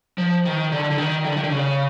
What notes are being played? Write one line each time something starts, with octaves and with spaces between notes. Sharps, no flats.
F3
D#3
D3
D3
D#3
D3
D#3
D3
C#3